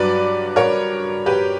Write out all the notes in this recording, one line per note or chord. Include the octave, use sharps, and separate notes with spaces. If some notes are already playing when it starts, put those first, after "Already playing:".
Already playing: G2 F#3 B4 D5
A#4 C#5
G4 B4